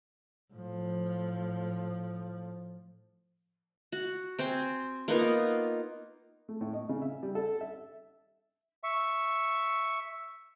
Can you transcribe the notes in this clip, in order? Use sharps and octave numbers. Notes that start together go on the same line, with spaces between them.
A2 F3
F#4
C4 C5 G#5
A#3 B3 D#4 F4
A3
A2
D#5
C#3
E5
G3
A4
E5
E5 C#6